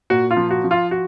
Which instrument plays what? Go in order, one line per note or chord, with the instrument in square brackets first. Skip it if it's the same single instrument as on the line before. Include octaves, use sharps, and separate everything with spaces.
[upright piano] A#2 F#4
F4
F3
F#4
F3
F4
F#4